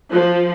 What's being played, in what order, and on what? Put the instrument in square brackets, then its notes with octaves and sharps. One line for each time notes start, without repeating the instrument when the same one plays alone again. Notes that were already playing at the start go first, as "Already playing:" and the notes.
[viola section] F3